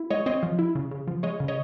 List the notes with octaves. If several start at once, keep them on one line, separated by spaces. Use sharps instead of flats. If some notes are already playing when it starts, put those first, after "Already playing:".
Already playing: E4
G#3 C#5 D#5
C4 C#5 D#5
F3
E4
C#3
C#3
F3
G#3 C#5 D#5
C#3
C#5 D#5